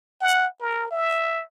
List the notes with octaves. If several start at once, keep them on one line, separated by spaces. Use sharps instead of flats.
F#5
A#4
E5